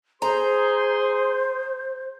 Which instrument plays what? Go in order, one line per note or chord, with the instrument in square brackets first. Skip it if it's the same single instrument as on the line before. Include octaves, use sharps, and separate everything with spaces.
[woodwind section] G#4 C6 [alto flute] C5 [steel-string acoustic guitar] A#5